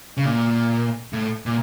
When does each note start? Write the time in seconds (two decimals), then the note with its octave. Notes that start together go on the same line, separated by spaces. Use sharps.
0.17 C#3
0.25 A#2
1.13 A2
1.46 A#2